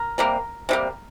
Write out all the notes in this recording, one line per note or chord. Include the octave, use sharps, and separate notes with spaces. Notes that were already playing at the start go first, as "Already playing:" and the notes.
Already playing: A#4
C3 G3 A#3
C3 G3 A#3